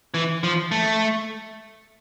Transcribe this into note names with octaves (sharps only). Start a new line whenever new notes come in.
E3
F3
A3